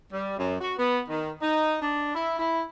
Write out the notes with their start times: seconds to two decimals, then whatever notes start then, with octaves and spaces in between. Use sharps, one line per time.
0.12 G3
0.38 F#2
0.61 F#4
0.78 B3
1.09 D#3
1.42 D#4
1.82 D4
2.15 E4
2.39 E4